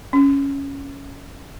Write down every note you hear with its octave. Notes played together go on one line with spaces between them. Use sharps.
C#4